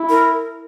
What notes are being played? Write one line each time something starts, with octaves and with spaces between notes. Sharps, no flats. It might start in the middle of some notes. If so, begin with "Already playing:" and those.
Already playing: E4
A#4